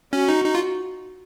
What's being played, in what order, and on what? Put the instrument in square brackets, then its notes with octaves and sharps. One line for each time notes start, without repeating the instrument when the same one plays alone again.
[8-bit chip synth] C#4 [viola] F#4
[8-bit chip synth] D#4
D#4
F4